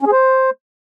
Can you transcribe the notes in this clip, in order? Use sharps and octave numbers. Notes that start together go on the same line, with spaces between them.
C#4
G#4
C5